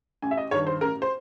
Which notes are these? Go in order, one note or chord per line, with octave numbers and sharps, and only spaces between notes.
A1 G#5
E5
D#5
G2 D#3 G3 C#5
C5
A1 A#4
C5